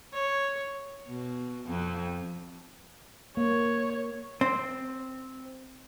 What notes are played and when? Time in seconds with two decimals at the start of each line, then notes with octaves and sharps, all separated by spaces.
0.13 C#5
1.08 B2
1.66 F2
3.37 A#3 C#5
4.41 C4